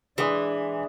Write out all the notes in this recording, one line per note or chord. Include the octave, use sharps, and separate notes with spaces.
E3 G#3 D4 D#6